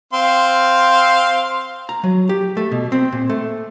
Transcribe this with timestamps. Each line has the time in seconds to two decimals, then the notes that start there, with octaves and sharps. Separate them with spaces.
0.13 C4 F5 C6
1.89 A#5
2.04 F#3
2.29 G4
2.57 A3
2.72 B2
2.92 C4
3.12 A#2
3.30 A3